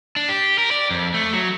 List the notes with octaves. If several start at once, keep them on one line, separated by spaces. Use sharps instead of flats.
D4
G4
A#4
D5
F2
A3
F#3